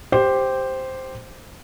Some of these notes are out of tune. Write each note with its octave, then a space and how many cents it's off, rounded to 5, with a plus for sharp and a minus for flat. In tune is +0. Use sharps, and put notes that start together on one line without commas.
G4 +0 C5 +0